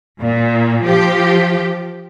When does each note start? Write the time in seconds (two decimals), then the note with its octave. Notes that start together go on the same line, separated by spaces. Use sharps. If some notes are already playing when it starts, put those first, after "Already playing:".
0.20 A#2
0.82 F3 G4